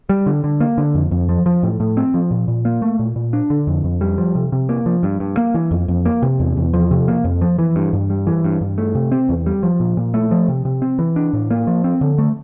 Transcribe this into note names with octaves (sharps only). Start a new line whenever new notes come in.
G3
D3
D3
A#3
D3
F2
F2
F3
F3
A2
A2
C4
F3
A#2
A#2
A#3
A3
A#2
A#2
D4
D3
F2
F2
G3
F3
C3
C3
A#3
F3
G2
G2
A#3
E3
F2
F2
A#3
C3
E2
E2
F3
C3
A#3
F2
F3
E3
G2
G2
G3
E3
G2
G2
A3
C3
C4
E2
G3
F3
A#2
A#2
A3
F3
C3
C3
C4
E3
D4
A2
A#3
F3
C4
D3
A3